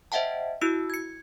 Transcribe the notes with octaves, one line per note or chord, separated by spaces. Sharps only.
C5 D#5 E5 F#5 G5 A5
E4 F#4 E6 C#7
G#6 C#7